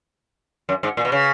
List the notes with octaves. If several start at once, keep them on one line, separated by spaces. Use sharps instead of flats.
F#2
G#2
A#2
B2
C#3